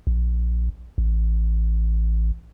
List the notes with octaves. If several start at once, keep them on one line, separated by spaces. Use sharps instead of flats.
A#1
A1